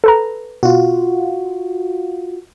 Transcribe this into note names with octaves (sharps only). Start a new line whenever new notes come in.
A4 B4 A#5
B2 F4 F#4